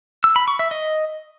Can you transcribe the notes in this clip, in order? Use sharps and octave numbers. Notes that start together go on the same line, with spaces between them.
E6
B5
C#6
E5
D#5